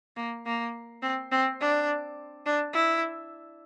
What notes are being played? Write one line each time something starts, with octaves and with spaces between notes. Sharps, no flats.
A#3
A#3
C4
C4
D4
D4
E4